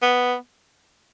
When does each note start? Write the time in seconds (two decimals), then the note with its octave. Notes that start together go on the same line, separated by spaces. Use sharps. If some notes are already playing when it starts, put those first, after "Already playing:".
0.02 B3